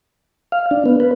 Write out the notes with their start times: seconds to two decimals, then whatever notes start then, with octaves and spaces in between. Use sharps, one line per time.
0.52 F5
0.71 D4
0.86 B3
1.00 B4